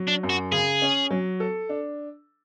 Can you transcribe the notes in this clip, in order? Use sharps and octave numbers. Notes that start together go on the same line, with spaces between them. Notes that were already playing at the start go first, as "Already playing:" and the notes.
Already playing: F#3
D4
F#2
F#4
C#3 G#4
C#4
F#3
A4
D4